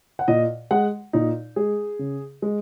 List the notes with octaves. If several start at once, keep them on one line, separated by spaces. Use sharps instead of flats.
F#5
A#2 D#5
G#3 F#5
A#2 D#4
G#3 G#4
C#3
G#3